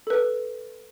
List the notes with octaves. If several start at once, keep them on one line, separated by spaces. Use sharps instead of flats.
A4 B4